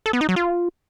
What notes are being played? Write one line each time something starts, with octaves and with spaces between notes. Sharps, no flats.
A4
B3
D#4
F#3
F4